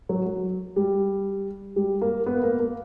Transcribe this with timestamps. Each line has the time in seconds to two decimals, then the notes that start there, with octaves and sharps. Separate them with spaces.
0.09 F#3
0.26 F#3
0.76 G3
1.76 G3
2.02 A#3
2.26 B3
2.43 A#3
2.60 A#3